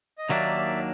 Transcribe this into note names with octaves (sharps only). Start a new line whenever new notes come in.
D#5
D#2 D#3 F#3 A#3 D4 D5 E5